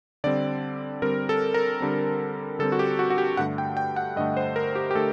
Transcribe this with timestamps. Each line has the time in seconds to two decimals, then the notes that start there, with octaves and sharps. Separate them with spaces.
0.24 D3 G3 C4 D5
1.02 D3 G3 C4 A#4
1.29 A4
1.54 A#4
1.81 D3 G3 C4
2.59 D3 G3 C4 A4
2.72 F#4
2.79 G4
2.99 F#4
3.10 F#4
3.18 G4
3.37 G2 D3 A3 F#5
3.58 G5
3.77 G5
3.96 F#5
4.16 G2 D3 A3 D#5
4.37 C5
4.56 A#4
4.75 G4
4.91 G4
4.95 D3 A3 A4